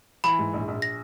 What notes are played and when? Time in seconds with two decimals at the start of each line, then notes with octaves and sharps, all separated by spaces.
0.24 E3 B5
0.39 G#2
0.54 A#1
0.68 A#1
0.82 A#6